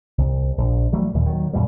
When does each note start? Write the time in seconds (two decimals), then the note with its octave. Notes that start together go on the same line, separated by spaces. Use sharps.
0.18 C2
0.58 A#1
0.92 E3 F#3 G3 A3
1.14 D#2 A#2
1.26 D#3 F#3
1.53 F#2 A#2 F3 G3